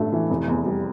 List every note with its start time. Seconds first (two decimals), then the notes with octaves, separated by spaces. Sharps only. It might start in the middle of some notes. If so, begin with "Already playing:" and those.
Already playing: A1 G2 A3
0.12 E3
0.30 F1
0.48 E2
0.66 G3